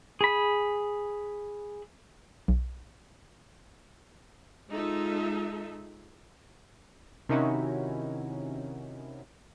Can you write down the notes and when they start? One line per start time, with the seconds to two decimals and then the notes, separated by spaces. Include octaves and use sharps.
0.21 G#4 B5
2.48 B1
4.69 G#3 D#4 F4 A4 E5
7.29 C3 D#3 C#4 D#4 E4 F#4